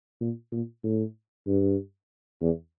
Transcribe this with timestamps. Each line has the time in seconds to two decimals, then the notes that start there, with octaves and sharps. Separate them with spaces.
0.21 A#2
0.52 A#2
0.83 A2
1.47 G2
2.41 E2